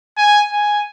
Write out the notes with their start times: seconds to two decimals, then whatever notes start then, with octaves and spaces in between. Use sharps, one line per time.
0.17 G#5
0.52 G#5